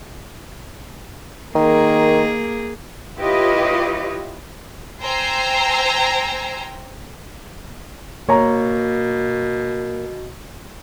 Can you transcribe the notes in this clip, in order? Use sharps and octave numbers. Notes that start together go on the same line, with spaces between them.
D#3 A#3 G#4
E4 F4 G4 B4 C#5 D#5
C5 G5 G#5 A#5 E6 C7
B2 A#3 C#5 A#5